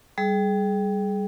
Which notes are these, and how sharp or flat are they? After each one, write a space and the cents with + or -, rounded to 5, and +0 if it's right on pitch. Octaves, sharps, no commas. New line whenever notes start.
G3 +0 G#4 +25